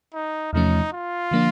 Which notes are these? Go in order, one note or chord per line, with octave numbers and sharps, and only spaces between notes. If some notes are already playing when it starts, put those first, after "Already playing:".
D#4
E2 C3 F3 A3 C#4 D#4
F4
D3 F3 A#3 D4